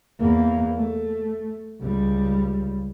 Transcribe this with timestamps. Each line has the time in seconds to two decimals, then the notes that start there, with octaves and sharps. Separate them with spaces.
0.20 E2 A#3
0.76 A3
1.81 C#2 G3